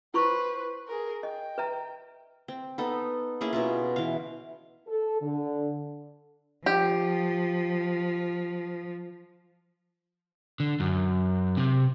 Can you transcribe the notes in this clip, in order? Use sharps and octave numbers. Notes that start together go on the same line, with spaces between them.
E4 B4 C5 B5 C#6
G#4 A#4
D#5 G5
B4 E5 A#5
C4
B3 D#4 A4
A#3 C#4 E4 G#4
B2 C#4 F4
E3 F5
A4
D3
F3 G4
D3
F#2
C3